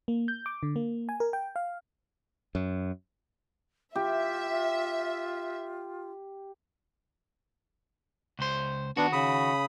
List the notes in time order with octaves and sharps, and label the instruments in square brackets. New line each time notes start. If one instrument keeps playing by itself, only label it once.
[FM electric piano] A#3
G6
D6
D3
A#3
G#5
A#4
G5
F5
[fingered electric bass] F#2
[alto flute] F4 [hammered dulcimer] G4 [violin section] E5
[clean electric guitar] C#2 C5
[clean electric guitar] D#3 F#4 [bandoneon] B3 D4
[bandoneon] C#3 B5 D#6